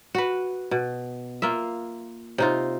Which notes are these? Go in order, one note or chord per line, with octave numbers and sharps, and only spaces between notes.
F#4 B4
B2
A#3 F4 E5
C3 D#4 F4